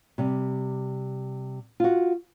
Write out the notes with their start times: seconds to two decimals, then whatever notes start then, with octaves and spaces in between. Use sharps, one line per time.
0.18 C3 G3
1.80 F4 F#4